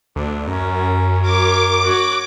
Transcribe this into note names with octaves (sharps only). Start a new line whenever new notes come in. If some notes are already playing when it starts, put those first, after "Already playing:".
D2 D4
F#2 C#4 A#5
A#4 C#5 D6
F#4 C#5